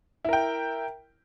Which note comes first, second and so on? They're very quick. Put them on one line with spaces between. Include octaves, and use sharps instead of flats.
E4 A#4 G5